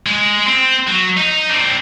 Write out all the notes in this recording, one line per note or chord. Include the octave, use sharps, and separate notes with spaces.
G#3
C4
F#3
D#4
C4 D4